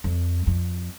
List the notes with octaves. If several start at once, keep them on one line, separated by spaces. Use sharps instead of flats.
F2
F2